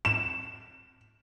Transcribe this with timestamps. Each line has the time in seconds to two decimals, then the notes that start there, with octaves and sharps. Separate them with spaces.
0.05 E7